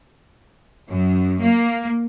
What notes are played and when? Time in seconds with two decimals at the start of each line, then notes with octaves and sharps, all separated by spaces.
0.88 F#2
1.41 A#3